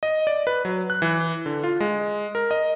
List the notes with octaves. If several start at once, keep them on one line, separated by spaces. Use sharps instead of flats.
D#5
D5
B4
F#3
F#6
E3
D3
F4
G#3
A#4
D#5